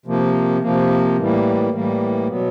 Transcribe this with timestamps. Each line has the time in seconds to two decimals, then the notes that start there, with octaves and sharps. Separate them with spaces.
0.06 C3 F3 A#3
0.61 C3 F3 A#3
1.17 A2 E3 G3 A#3
1.72 A2 E3 G3 A#3
2.28 B2 F#3 B3